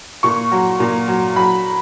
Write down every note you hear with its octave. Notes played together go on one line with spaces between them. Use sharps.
A#2 C#6
F#3
A#2
F#3
F#3 B5